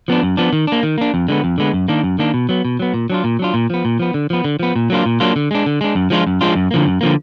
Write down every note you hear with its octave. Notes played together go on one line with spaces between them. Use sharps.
F3 B3 D4
F#2
F3 B3 D4
D#3
A#3 D4
D#3
A#3 D4
F2
D3 G#3 B3
F2
D3 G#3 B3
F#2
D#3 A#3 D4
F#2
D#3 A#3 D4
B2
F#3 B3
B2
F#3 B3
A#2
F#3 D4 F4
A#2
F#3 D4 F4
A#2
F3 B3
A#2
F3 B3
D3
F3 B3
D3
F3 B3
A#2
F#3 A#3 D4 F4
A#2
F#3 A#3 D4 F4
D3
G#3 D4
D3
G#3 D4
F#2
F3 G#3 D4 F4
F#2
F3 G#3 D4 F4
F#2
D3 F3 A#3
F#2
D3 F3 A#3